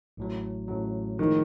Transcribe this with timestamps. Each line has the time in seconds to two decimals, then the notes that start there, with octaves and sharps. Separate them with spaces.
0.17 A1 A2 F#3
0.68 A1 A2 F#3
1.19 A2 D#3 F3 G#3